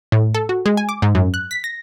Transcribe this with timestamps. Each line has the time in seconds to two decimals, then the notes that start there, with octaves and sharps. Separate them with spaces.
0.12 A2
0.35 A4
0.49 F#4
0.66 G#3
0.77 G#5
0.89 D6
1.02 G#2
1.15 F#2
1.34 F#6
1.51 B6
1.64 A#6